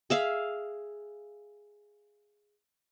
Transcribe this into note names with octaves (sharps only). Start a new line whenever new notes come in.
G#4 E5 F5